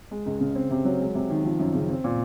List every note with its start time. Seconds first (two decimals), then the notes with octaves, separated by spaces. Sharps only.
0.11 G#3
0.26 C#2
0.40 C#3
0.55 C4
0.71 C3
0.85 F#3
1.00 G#3
1.15 C3
1.30 D#3
1.45 F3
1.59 F#2
1.74 C#3
1.89 C4
2.04 A#2